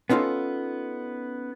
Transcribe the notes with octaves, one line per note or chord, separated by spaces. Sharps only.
B3 C#4 D#4 F4 A4